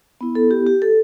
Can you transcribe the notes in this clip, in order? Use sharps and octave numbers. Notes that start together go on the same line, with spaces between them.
B3 E4
A4
G4
G4
A4